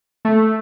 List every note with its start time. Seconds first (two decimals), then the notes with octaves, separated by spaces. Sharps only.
0.25 A3